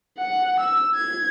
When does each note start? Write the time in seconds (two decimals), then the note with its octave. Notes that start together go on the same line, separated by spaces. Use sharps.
0.18 F#5
0.59 E6
0.95 G#6